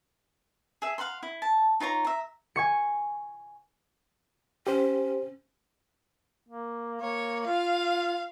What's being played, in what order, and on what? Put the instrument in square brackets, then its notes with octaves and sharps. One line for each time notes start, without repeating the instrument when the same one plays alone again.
[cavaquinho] G#4 E5
F5 F#5 B5 C6
E4
A5
D#4 F4 C#5 A#5
E5 A#5
[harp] G#5 C#6 C#7
[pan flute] C#4 [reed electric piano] G4 C5
[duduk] A#3
[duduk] A#3 [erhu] C#5
[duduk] F4 [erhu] F5